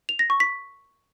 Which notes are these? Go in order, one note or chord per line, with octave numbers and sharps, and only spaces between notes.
F7
A#6
C#6
B6